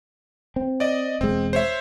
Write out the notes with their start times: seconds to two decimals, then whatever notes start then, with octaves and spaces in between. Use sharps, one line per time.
0.56 C4
0.80 D5 D#5
1.21 E1 G#3 C4
1.53 C5 C#5 E5